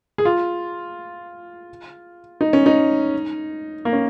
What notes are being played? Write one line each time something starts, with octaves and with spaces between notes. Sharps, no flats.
G#4
F4
D#4
C#4
D#4
A#3
C#4